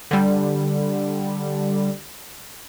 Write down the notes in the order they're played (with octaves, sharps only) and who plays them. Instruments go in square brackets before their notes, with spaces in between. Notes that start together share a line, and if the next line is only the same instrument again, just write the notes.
[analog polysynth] D3 G3